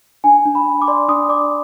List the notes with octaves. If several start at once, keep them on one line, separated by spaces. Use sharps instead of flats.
D4 G#5
D4
B5
D4
D6
D5 C6
D4 D#6
D5 D6